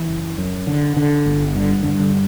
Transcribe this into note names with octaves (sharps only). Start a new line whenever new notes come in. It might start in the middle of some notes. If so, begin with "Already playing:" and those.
Already playing: E3
F#1
F#2
D3
D3
G1
G2 D3
G2 D3
D3